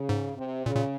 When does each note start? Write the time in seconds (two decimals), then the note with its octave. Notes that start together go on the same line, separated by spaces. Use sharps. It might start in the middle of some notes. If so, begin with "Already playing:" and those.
Already playing: C#3
0.09 G#2
0.37 C3
0.65 A#2 C#3
0.75 A#2